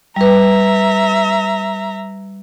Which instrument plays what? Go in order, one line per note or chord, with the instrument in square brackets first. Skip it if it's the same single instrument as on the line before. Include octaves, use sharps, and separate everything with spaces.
[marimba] G3 B4 [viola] E5 A#5